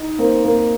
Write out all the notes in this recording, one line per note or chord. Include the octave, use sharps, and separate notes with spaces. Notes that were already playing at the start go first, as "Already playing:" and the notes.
Already playing: D#4
A#3 C4
A#3